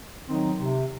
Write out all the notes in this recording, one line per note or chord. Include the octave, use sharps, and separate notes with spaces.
D#3 F#3 C4 D#4
C3